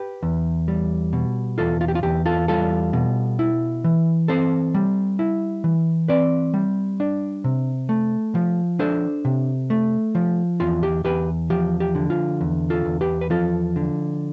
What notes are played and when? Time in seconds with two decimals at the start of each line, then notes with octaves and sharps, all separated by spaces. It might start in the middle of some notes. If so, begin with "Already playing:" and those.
Already playing: G4 B4
0.23 E2
0.68 G3
1.13 B2
1.58 E2 F4 A4
1.81 F4
1.88 G4
1.95 F4
2.03 E2 G4
2.26 F4 A4
2.48 G3 F4 A4
2.93 B2
3.39 E4
3.84 E3
4.28 C4 A4 C5
4.74 G3
5.19 E4
5.64 E3
6.08 C4 B4 D5
6.54 G3
7.00 D4
7.44 C3
7.89 A3
8.35 F3
8.79 D4 A4 C5
9.25 C3
9.70 A3
10.15 F3
10.60 E2 F4
10.83 G4
11.04 E2 G4 B4
11.50 F3 G4
11.80 G4
11.95 D3
12.10 F4
12.41 E2
12.70 F4 A4
12.85 E2
13.01 G4 B4
13.21 B4
13.30 F3 F4 A4
13.76 D3